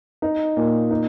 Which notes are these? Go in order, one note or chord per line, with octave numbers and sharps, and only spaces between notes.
D#4
A#2
D#4